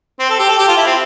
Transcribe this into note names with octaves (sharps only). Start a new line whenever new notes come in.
C4
A4
G4
A4
G4
F4
E4
C4